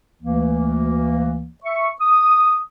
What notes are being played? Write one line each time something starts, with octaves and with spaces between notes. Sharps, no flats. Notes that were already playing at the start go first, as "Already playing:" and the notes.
D2 E3 A#3
E5 C#6
D#6